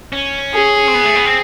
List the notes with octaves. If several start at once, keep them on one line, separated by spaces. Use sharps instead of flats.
C#4
G#4
C4
B3
A3
B3
C4